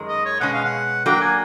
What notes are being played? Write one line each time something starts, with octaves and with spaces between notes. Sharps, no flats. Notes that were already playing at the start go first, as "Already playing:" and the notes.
Already playing: F#2 D#3 G#3
D#5
C#5
B2 G#3 C#4 F#5
F5
F#5
F#3 A#3 D4 F#4 A#4 G5
G#5